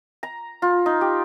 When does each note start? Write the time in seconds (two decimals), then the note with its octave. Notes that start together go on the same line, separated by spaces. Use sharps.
0.23 A#5
0.62 F4
0.86 D#4
1.01 G4